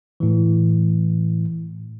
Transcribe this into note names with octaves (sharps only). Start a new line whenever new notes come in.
A2 E3